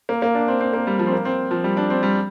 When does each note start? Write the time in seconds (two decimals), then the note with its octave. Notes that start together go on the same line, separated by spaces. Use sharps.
0.09 A#3
0.22 A#3
0.35 D4
0.48 C4
0.60 C4
0.73 A#3
0.87 G3
0.99 F3
1.07 C4
1.13 A#3
1.25 C4
1.51 F3
1.64 G3
1.77 D4
1.90 C4
2.03 G3